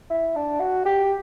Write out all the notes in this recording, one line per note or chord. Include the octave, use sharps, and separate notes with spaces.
E4
D4
F#4
G4